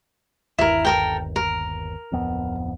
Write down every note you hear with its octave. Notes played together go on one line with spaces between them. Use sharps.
G1 D#2 E4 A#4
A4 A#4 G5
A#4
D1 F2 B3